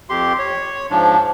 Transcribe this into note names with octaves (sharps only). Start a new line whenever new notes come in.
F2 G4 C6
C#5
G#2 F3 D4